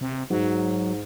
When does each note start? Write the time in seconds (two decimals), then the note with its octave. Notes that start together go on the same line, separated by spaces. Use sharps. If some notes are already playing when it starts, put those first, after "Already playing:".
0.01 C3
0.30 G#2 F#3